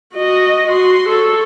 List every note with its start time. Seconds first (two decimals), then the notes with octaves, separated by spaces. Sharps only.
0.15 F#4 D#5
0.68 F#4 C6
1.09 A4 C#5